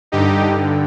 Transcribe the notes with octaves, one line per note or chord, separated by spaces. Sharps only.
G2 D3 D#4 G4